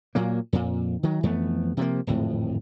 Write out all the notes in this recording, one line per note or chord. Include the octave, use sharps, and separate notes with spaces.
A#2 F#3 A#3
F2 A#2
D#3 F#3
F2 E3 A3 B3
C3 F3 A#3
D1 G#1 F2 A2